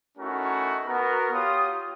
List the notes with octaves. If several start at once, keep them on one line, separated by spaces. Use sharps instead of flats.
A3 C#4 D#4 E4 F#4 A#4
B3 F#4 A#4
F4 G4 C#5 D#6